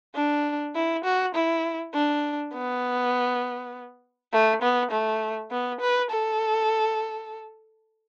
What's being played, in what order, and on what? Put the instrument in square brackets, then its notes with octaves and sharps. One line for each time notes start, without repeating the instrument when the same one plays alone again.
[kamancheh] D4
E4
F#4
E4
D4
B3
A3
B3
A3
B3
B4
A4